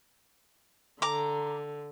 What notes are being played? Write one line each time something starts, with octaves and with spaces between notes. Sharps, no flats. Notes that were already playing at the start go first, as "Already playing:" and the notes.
D3 A#5 D6